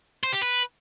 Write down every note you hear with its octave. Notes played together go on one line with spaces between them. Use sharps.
C5
G4
B4